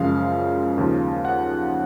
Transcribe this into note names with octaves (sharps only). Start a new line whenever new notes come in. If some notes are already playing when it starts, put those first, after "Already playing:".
Already playing: F#2 C#3 F3 G#3 F5
D#2 C#3 F3
F#5